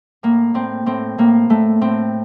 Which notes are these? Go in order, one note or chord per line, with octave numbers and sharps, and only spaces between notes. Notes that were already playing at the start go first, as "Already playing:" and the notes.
A2 A#3
A2 C4
A2 C4
A2 A#3
A2 A3
A2 C4